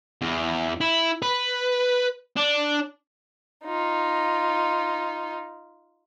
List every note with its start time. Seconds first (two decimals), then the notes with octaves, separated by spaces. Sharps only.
0.21 E2
0.81 E4
1.22 B4
2.37 D4
3.64 D#4 F4